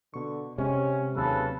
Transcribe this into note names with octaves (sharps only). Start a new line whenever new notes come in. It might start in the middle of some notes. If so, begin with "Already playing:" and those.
B2 D3 C#6
C3 G#3 C#4
D#2 C#3 F#3 A4 B4